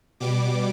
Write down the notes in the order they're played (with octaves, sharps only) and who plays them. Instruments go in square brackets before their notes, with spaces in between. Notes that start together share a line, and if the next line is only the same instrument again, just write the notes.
[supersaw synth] B2 G3 D6